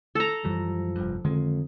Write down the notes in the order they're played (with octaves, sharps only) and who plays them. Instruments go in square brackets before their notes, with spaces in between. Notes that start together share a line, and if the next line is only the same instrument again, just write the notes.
[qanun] A4 A#5
[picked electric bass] F#2 E3 G3 [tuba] F3
[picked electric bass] F1 G2
[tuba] F2 [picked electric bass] D3 D#3 G#3